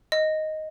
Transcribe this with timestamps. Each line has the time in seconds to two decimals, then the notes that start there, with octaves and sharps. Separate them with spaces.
0.12 D#5